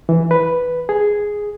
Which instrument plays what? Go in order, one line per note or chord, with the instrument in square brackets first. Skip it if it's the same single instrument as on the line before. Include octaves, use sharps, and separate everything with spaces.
[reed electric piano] E3
B4
G#4